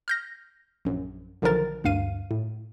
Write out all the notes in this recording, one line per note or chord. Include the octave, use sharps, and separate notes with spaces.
F6 G6 A#6
A#1 F#2
B1 D3 D#3 F3 A#4 A6
D2 G2 F5 D#7
A2